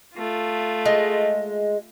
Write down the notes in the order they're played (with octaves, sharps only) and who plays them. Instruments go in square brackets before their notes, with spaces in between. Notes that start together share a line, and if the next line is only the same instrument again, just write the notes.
[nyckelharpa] A3 F4
[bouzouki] G#3